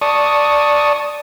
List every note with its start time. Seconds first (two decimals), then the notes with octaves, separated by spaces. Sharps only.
0.02 D5 A5 C#6 D#6